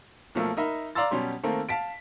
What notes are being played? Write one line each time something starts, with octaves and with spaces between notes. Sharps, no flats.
B1 F3 A3 A#3
D#4 A#4 E5 B5
D5 F5 A#5 C6 E6 A6
B2 F#3 G3 C#4 G4 C6
D#3 A3 A#3 C4 A4
F5 A5 B6 D7